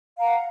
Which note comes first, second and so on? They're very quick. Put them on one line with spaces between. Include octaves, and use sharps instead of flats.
F5 A#5 F#5